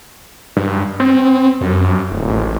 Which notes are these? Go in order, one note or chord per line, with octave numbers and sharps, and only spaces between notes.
G2
C4
F#2
D1
A1